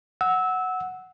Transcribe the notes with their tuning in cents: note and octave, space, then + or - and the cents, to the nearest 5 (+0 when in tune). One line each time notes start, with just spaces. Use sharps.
F#5 +0 E6 -20